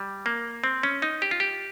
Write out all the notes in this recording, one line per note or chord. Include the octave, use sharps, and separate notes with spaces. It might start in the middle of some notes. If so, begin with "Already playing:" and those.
Already playing: G3
A#3
C4
C#4
D#4
G4
F4
G4